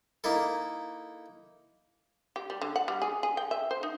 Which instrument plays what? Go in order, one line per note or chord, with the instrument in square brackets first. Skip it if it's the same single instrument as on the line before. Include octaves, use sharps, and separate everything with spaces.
[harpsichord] A#3 D#4 E4 A4
[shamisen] G4
G3
D3
F#5
G3
G#4
G#4
G5
E5
C5
D#4